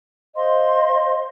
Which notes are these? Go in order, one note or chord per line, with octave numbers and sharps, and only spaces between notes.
C5 D#5 F5 C6